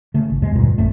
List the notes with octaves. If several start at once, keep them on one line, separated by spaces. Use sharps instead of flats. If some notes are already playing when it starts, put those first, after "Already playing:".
C#3 A3
G#1
E2 C3 G#3
D#1 D2 G2 A#2
G#1 F#2 A3